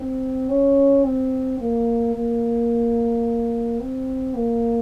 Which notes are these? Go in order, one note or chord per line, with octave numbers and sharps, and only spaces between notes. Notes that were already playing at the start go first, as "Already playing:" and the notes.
Already playing: C4
C#4
C4
A#3
A#3
C4
A#3